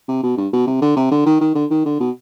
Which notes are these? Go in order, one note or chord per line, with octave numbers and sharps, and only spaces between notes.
C3
B2
G2
B2
C3
D3
C3
D3
D#3
D#3
D3
D#3
D3
B2